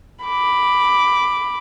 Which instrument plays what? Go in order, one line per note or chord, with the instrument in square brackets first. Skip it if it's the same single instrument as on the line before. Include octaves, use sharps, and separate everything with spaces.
[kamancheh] B5 D6